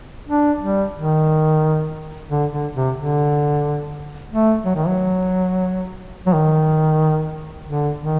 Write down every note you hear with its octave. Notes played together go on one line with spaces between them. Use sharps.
D4
G3
D#3
D3
D3
C3
D3
A3
F#3
D#3
F#3
F#3
D#3
D3
D#3